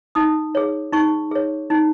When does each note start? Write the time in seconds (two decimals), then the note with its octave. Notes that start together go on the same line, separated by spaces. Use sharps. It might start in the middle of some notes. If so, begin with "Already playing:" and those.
0.15 D#4 D#6
0.55 G#4 C#5
0.93 D#4 C#6
1.31 G#4 C#5
1.70 D#4